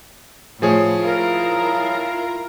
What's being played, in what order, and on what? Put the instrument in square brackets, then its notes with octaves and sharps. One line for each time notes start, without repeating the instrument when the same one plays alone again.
[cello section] A2 [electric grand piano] F3 G#4 C#5
[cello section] E4 F4 A#4